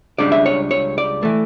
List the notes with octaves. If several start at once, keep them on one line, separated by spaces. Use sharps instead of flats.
C#2 C#3 G3 D4 D5
E5
C#5
C#5
D5
E3 A3